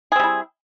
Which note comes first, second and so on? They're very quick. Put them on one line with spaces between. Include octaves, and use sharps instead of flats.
G#4 C4 G3 E4